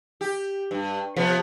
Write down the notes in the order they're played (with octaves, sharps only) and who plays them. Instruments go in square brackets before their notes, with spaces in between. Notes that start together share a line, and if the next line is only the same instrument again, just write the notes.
[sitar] G4
G2
C3 F3 B3